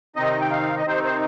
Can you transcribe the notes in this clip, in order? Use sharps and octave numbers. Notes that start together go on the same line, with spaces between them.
C3 D#3 C4 D#4 D#5
G5
F5
D#5
C3 D#3 C4 D#4 C5
C5